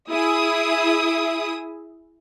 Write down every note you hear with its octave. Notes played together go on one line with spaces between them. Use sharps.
E4 G#4 E5 D#6